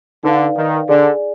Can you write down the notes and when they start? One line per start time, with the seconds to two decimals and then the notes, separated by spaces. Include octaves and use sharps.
0.24 D3 D#4 B4 D5 F5
0.56 D#3
0.89 D3 G#4 D5 G#5